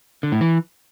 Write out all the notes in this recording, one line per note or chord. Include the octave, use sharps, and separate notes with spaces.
D3
A2
E3